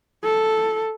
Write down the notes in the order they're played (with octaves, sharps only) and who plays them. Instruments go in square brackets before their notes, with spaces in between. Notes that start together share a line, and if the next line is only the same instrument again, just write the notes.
[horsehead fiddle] A4